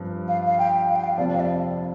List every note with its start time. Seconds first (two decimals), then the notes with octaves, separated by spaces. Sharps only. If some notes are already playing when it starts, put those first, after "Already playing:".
Already playing: G2 F3 C4
0.28 F5
0.47 F5
0.58 G5
0.88 F5
0.96 G5
1.04 F5
1.17 F2 C3 F3 D5
1.33 F5
1.40 D5